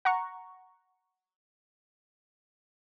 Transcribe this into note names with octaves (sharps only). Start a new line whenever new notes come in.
F#5 A#5 C#6